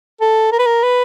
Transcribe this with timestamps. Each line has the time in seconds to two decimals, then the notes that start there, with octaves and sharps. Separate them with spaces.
0.21 A4
0.52 A#4
0.59 B4
0.66 A#4
0.83 B4